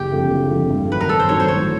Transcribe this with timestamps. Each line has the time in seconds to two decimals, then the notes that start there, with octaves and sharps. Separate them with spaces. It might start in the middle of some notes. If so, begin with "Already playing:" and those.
Already playing: F#1 G4
0.12 F2 D3 F3
0.31 F#1
0.50 F2 D3 F3
0.70 G2
0.90 D#3 F#3 B4
1.01 A#4
1.09 G2 A4
1.20 C5
1.29 D#3 F#3 C#5
1.40 C5
1.48 A1 C#5